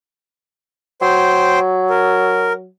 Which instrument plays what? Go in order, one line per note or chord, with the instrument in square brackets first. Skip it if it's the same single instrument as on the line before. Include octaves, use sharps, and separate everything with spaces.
[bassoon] F#3 [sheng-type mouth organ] C5 G5 C6
[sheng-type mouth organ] A#4